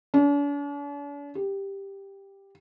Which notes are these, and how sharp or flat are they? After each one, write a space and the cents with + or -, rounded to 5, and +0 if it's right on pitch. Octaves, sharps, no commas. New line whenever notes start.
D4 -45
G4 +5